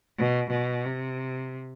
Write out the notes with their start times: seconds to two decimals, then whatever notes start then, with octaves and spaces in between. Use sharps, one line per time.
0.18 B2
0.51 B2
0.85 C3